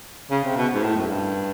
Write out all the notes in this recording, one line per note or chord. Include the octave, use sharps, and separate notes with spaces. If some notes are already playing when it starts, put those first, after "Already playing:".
C#3
C3
B2
G#2
A2
F#2
G2